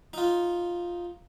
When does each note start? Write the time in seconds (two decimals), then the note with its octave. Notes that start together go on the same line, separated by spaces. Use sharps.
0.13 D#4 F4